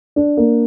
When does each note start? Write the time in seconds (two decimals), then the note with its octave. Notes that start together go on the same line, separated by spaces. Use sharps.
0.16 D4
0.37 A#3